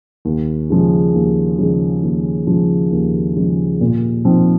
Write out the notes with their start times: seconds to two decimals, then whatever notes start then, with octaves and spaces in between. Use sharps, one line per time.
0.25 D#2
0.70 C#3 F3 G#3
1.14 D#2
1.59 C#3 F3 G#3
2.02 D#2
2.47 C#3 F3 G#3
2.92 D#2
3.36 C#3 F3 G#3
3.81 A#2
4.25 F3 C4 D#4